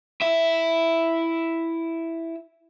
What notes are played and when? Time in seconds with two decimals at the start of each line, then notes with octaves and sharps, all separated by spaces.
0.22 E4 E5